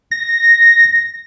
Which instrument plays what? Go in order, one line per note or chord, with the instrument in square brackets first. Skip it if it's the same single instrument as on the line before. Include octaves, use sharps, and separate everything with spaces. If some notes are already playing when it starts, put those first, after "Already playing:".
[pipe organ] A#6